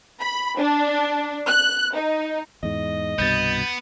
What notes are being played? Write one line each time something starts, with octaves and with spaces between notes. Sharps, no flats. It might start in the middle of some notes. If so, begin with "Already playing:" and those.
B5
D4
F#6
D#4
E2 G#2 D#5
C2 G2 B2 B3 G6 A6